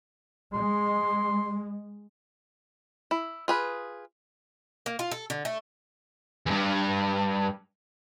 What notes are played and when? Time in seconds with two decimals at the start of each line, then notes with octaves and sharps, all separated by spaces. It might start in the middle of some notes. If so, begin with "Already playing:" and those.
0.54 G#3 C6
3.11 E4
3.48 F4 G#4 B4
4.86 A#3
4.99 F4
5.11 A4
5.30 D3
5.45 A3
6.46 E2 G2